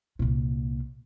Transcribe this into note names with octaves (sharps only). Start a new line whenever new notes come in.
C2 A#2